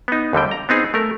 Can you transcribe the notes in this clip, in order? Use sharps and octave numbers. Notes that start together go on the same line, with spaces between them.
B3 D#4
D#2 D3 G3 G5
A#5
B3 C4 D#4 G#4
A3 A#4